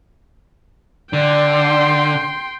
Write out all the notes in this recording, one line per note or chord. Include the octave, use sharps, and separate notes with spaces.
D3 D5 G5 C6